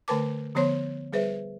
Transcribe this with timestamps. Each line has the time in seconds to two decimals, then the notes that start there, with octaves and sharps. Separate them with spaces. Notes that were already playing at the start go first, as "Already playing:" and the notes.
0.08 D3 A3 A#4 B4 A5 D6
0.55 D3 F3 B3 C5 C#5 C6
1.13 G3 G#4 B4 C5 E5